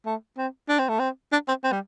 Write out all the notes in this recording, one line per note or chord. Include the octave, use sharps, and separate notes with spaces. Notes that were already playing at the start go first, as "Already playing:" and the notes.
A3
C4
D4
C4
A3
C4
D4
C4
C4
G3